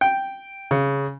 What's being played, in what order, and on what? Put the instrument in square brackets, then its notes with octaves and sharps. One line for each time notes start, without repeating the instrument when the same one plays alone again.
[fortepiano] G5
C#3